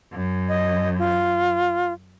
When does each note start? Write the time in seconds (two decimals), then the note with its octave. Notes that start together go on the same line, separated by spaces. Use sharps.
0.12 F#2
0.49 D#5
0.99 F4